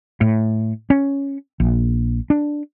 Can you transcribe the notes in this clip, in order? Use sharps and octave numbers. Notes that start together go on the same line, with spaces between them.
A2
C#4
A#1
D4